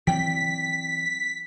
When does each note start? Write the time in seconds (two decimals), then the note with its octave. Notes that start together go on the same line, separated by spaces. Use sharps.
0.07 E3 F#3 C4 D5 G5 B6